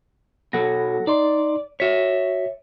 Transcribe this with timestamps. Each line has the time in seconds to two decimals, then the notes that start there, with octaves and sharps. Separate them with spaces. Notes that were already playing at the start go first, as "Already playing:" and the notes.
0.53 B2 F#3 A4 F#5 A#6
1.07 D#4 D5 C6
1.80 F#4 C#5 E5 B6